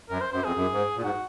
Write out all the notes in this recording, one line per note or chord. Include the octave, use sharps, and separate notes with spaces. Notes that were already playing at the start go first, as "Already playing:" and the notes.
F#2 A#4
C5
F#2 C5
F2 G#4
F#2
G#2
A#2
G#2 F#4